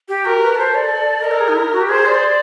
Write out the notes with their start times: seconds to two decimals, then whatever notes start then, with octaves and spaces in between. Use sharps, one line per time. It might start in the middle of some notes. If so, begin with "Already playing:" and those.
0.08 G4
0.25 F#4 A#4
0.42 B4
0.58 A4 C5
0.75 D5
1.23 A#4 D#5
1.31 A4
1.40 G#4
1.49 D#4
1.56 E4
1.72 F#4
1.81 G4
1.89 G#4 C5
2.06 D5